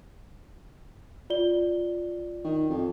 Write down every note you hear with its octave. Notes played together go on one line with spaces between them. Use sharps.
F4 D5 G7
D#3
F2